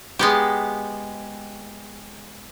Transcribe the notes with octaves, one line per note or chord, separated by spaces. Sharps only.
G#3 B3 G4